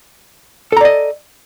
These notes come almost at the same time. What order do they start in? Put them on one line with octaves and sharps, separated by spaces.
A4 A#5 D5 D#5